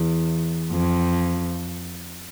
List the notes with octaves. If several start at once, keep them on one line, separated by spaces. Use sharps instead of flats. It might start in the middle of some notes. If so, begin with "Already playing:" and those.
Already playing: E2
F2